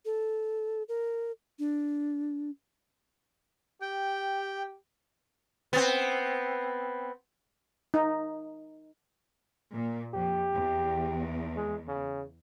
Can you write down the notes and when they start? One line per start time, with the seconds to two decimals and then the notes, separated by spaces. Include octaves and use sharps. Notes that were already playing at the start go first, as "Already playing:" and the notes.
0.05 A4
0.89 A#4
1.59 D4
3.81 G4 G5
5.73 B3 C4
7.94 D#4
9.72 A#2
10.14 F2 G4
10.53 E2
11.57 G#3
11.88 C#3